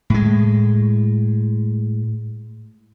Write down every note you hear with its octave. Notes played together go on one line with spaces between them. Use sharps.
A2 G#3